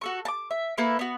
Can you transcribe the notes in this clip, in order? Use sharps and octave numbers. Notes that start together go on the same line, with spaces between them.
F#4 A4 C#6
A5 D6
E5
A#3 E4 A4 B4
B3 F#4